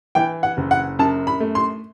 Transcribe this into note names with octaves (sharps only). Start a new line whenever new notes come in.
E3 G5
F#5
F#1
F#5
F#2 A5
B5
A3
C6